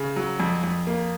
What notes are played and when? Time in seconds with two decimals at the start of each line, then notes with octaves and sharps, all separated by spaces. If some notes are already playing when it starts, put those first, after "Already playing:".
Already playing: C#3
0.16 F#3
0.40 F2
0.64 F2
0.87 A#3